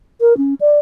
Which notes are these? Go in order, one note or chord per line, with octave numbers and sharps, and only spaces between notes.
A#4
C#4
D5